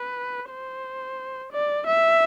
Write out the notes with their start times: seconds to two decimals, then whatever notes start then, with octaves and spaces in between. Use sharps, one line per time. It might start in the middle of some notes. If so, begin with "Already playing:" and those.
Already playing: B4
0.50 C5
1.52 D5
1.87 E5